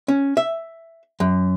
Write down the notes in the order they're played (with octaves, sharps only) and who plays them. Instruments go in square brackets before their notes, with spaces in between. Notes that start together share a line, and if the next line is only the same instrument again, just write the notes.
[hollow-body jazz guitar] C#4
E5
F#2